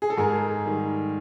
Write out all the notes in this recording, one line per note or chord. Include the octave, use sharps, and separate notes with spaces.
G#4
A4
G#2 G#4 A#4
D#3 G3